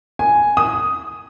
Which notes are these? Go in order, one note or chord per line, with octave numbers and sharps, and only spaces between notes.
G#5
D#6